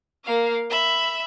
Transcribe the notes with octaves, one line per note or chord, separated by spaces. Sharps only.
A#3 F5
E5 B5